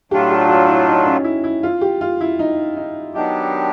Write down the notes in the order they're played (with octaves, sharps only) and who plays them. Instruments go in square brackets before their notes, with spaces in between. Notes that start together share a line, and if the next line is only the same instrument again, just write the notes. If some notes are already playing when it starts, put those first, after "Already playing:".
[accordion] A2 F#3 A3 D4 F4 [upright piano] G4
[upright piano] G4
F#4
E4
D#4
C#4
E4
E4
F4
G4
F4
E4
D#4
D#4
[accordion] D#3 F#3 B3 D4 G4 [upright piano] D#4